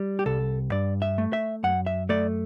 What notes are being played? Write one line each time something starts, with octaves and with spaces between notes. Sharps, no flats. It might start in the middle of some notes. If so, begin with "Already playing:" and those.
Already playing: G3
G4
C2 A4
G2 D5
E5
A3
E5
F#2 F#5
E5
A3 D5